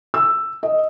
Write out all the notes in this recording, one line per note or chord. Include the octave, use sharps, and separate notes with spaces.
E6
D#5